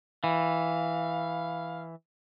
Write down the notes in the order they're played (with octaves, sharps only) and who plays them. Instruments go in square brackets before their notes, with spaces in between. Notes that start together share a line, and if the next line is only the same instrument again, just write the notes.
[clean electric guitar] E3 [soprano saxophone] F5